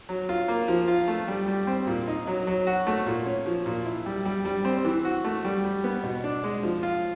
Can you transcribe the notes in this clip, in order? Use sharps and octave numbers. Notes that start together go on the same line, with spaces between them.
F#3
F4
A#3
F3
F4
A3
G3
G3
C4
A#2
D#4
F#3
F#3
F#4
A3
A#2
C#4
F3
A#2
E4
G3
G3
G3
C4
E3
F#4
A3
G3
G3
B3
B2
D4
G#3
F3
F4